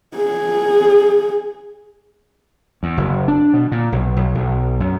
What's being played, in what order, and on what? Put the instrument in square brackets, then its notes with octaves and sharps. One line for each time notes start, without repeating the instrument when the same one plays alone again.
[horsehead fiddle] G#4
[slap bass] E2
F#1
D4
B2
A#2
B1
B1
B1
F#2